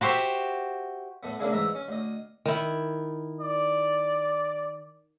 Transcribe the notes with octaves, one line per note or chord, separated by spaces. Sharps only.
F#4 G4 C5 E5
A2 A3 B3
A2 C#3 A#3 D4 E4 G#4
G#2 E3 E5 A#5
C#4
D2 D#5
D#3 E4
D5